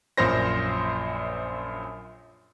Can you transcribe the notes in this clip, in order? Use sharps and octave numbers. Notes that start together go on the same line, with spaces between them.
A#1 F#2 A#2 C5 A#6